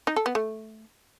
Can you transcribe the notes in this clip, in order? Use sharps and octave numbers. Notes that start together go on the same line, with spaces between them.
D#4
A4
B3
A3